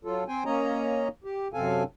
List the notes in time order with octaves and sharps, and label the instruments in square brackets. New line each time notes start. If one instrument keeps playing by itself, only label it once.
[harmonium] F#3 F4 A4
C4 C5 G5 G#5
A#3 C#4 C#5 D#5 A#5
G4
F#2 C3 C4 A4 F5 G#5